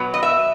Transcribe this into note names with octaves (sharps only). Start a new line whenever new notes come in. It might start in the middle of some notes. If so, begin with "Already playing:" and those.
Already playing: B2 F#3 B3
D#5
E5